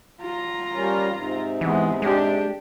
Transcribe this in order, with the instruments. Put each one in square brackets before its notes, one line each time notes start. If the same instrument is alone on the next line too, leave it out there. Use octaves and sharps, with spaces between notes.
[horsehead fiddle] F4 A#5
[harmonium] G3 A#3 C#4
G#2 C3
[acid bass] E3 [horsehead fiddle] G#3 B3
[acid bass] G#3 [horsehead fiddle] D4 G4